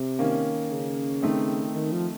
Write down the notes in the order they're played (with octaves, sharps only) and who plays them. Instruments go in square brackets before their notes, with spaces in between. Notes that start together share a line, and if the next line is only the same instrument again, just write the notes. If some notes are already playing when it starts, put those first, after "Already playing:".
Already playing: [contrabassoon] C3
[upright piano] D#3 A#3 C#4
[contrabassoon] C#3
[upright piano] D#3 A3 C4 D#4
[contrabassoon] D#3
F3